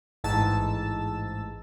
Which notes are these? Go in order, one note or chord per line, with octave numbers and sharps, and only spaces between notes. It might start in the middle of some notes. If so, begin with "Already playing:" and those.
A1 G#2 A5 E6